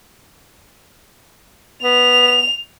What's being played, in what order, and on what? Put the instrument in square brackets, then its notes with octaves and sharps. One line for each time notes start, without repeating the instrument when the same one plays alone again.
[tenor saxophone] B3 [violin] F7